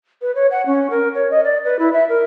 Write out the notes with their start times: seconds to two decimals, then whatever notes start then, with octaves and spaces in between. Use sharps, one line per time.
0.22 B4
0.35 C#5
0.51 F#5
0.66 C#4
0.90 A#4
1.15 C#5
1.31 D#5
1.44 D5
1.64 B4
1.79 E4
1.93 E5
2.09 A#4